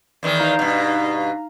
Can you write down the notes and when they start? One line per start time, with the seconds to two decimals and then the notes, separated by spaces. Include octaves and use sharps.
0.23 E2 D#3 E3
0.40 D#4 F5 A#5
0.59 G2 B2